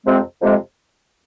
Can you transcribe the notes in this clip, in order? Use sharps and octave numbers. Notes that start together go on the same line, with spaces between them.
F2 C3 G#3 C4
F2 C3 G#3 C4